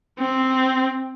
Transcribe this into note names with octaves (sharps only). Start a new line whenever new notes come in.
C4